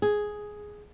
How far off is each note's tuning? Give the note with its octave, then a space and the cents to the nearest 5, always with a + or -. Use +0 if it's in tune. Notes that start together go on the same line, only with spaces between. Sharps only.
G#4 +5